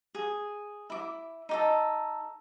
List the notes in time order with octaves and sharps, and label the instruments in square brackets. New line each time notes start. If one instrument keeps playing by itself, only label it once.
[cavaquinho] G#4
E4 D6
D#4 G4 A4